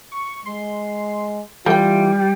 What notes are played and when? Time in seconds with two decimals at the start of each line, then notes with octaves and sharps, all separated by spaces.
0.12 C#6
0.46 G#3 C6
1.66 E3 G3 A3 F4 G5